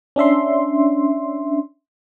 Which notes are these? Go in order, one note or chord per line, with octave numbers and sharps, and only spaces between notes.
C#4 D4 E5 C6